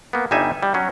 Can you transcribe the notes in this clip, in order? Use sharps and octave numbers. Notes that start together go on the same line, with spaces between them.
A#3 B3
G1 G3 D#4 E5 G#5
G3
F#3 C#4